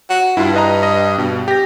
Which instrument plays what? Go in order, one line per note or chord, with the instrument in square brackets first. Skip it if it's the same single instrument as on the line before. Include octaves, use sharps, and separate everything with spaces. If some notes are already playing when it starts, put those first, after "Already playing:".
[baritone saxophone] F#4
[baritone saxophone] G2 [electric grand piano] E4 F4
[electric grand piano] B4 D#5 A#5
D#5
[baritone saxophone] G2 [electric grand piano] B2
[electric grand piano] G4 A#6